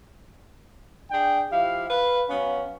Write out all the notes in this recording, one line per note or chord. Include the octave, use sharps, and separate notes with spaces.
D4 G#4 G5
F3 E4 G4 F5
B4 F5
F#3 B3 C#4 F5